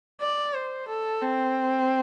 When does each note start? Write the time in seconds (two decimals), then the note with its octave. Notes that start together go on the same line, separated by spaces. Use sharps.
0.21 D5
0.54 C5
0.88 A4
1.22 C4